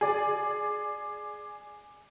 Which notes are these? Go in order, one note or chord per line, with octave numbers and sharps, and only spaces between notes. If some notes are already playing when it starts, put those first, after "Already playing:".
G#4 D5